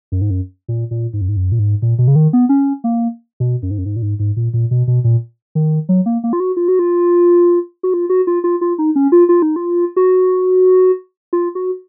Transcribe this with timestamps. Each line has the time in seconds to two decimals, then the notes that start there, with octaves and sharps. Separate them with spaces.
0.12 F#2
0.21 G#2
0.31 F#2
0.68 A#2
0.91 A#2
1.13 G#2
1.21 F#2
1.29 G#2
1.37 F#2
1.52 A#2
1.59 G#2
1.82 A#2
1.99 B2
2.08 C#3
2.16 D#3
2.33 B3
2.49 C#4
2.84 A#3
3.40 B2
3.63 F#2
3.71 G#2
3.78 F#2
3.86 G#2
3.96 A#2
4.02 G#2
4.19 G#2
4.37 A#2
4.54 A#2
4.71 B2
4.88 B2
5.04 A#2
5.55 D#3
5.89 F#3
6.06 A#3
6.24 A#3
6.33 F4
6.40 F#4
6.57 F4
6.68 F#4
6.79 F4
7.83 F#4
7.94 F4
8.10 F#4
8.27 F4
8.44 F4
8.61 F4
8.79 D#4
8.96 C#4
9.12 F4
9.29 F4
9.42 D#4
9.56 F4
9.97 F#4
11.33 F4
11.55 F#4